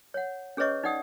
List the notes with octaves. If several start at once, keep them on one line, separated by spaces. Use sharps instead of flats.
C#5 F#5
C#4 G#4 B4 C#5 D#5 C#6
D#4 D5 F#5 G5 D#6